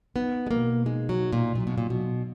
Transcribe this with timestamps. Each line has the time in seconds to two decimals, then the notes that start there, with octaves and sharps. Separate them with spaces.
0.15 B3 D#4
0.47 G#3
0.51 B2 A#3
0.86 G#3 D#4
1.09 F#3
1.20 D#4
1.32 A#2
1.56 A#2 F#3
1.67 B2
1.78 A#2
1.90 B2 F#3